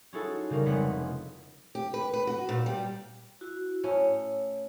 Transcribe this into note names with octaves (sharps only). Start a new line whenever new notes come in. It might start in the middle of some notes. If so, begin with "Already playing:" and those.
C#4 D#4 E4 F#4 G#4 A4
C#3 G3 F#4 A#4
F1 G#3 B3 F#5 B6
G4
B4
B4
F#4
A#2
G3
E4 F#4
A2 C#4 E4 C#5